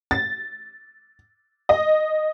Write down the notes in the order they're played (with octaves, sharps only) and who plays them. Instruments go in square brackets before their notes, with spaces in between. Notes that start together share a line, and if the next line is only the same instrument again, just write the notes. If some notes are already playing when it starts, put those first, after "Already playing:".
[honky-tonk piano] A6
D#5